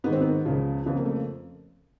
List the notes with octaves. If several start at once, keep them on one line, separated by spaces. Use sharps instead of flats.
G#2 D#3 B3
C4
B3
C#2 C#3 F3
F2 C#3 F3 B3
A#3
A3